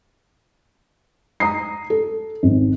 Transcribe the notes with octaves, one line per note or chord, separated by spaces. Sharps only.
A#5 D#6 C7
A4
G#1